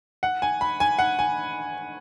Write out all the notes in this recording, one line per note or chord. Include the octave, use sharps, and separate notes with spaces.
F#5
G#5
B5
G#5
F#5
G#5